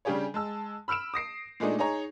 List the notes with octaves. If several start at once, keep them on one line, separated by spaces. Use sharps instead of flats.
C#3 G3 D4 G4 G#4 C#5
G#3 A5 E6
B5 E6 F6 D7 E7
D#6 A#6 C7 D7
A#2 G#3 A3 D4 D#4
D#4 G#4 C#5 A#5